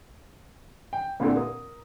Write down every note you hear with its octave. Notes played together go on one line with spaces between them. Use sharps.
G5
A#2 D3 C4 E4 G4 A4
A#4 D#6